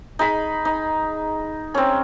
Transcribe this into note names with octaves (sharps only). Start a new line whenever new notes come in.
D#4 G#4 B5
D#4
C4 C#4